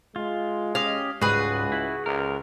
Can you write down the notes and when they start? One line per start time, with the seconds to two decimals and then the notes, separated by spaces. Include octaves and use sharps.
0.16 G#3 F4
0.75 C#4 G4 D#5 F5
1.22 C#2 G#2 G3 F#4 G#4 B4
1.72 E4
2.06 C#2 A#4